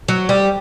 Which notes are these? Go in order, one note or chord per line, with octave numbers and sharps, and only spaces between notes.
F#3
G3